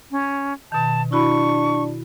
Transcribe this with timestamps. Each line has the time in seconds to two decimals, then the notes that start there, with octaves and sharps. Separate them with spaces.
0.11 C#4
0.72 B2 D#3 A5
1.12 D4 E4 F#4 B5 C#6